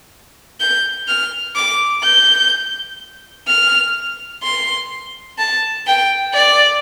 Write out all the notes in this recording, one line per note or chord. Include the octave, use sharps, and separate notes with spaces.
G6
F6
D6
G6
F6
C6
A5
G5
D5